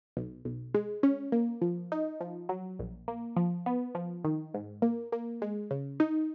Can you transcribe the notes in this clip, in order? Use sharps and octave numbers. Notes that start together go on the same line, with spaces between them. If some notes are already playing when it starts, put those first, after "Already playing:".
B1
B1
G#3
C#4
A#3
F3
D#4
F3
F#3
A#1
A#3
F3
B3
F3
D#3
G#2
A#3
A#3
G#3
C#3
D#4